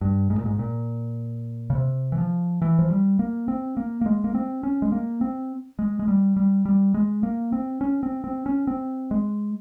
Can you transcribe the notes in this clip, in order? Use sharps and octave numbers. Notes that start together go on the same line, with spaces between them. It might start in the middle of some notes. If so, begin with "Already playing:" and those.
G2
G#2
A#2
G#2
A#2
C#3
C3
E3
F3
E3
F3
G3
A#3
C4
A#3
A#3
G#3
A#3
C4
C#4
G#3
A#3
C4
G#3
G#3
G3
G3
G3
G#3
A#3
C4
C#4
C4
C4
C#4
C4
G#3